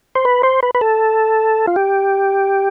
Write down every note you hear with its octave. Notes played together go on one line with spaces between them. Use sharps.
C5
B4
C5
B4
B4
A4
F4
G4